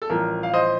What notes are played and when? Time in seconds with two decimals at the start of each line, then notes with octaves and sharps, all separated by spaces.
0.02 A4
0.10 A1 G2 F3 A#4
0.43 F5
0.53 C5 D#5